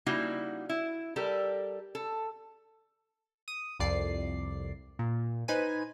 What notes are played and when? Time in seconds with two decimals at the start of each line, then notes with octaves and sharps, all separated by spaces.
0.06 C#3 G3 A#3 D#4 E4 F#4
0.69 E4
1.16 G3 G4 A4 A#4
1.95 A4
3.48 D#6
3.80 C2 F2 D5 C7
4.99 A#2
5.48 D#4 B4 C5 G#5 D#7